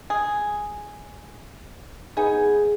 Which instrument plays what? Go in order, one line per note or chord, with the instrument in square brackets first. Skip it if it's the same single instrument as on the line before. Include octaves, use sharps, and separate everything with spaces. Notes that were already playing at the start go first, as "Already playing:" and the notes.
[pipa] G#4
[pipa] B3 D#4 G#5 [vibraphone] G#4